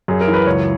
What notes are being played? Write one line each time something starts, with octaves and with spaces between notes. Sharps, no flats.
F#2 G#4
A#4
E3
B4
C#2 C#5